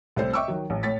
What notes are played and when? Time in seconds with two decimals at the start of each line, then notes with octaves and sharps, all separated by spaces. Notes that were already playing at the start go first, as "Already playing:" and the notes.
0.16 C2 A3 C4 A4 C5
0.33 D#5 E5 G5 C#6 D6 E6
0.48 D#3 F#3
0.70 A1
0.83 A2 C#5 A6 B6